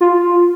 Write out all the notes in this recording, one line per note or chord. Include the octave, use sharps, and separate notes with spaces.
F4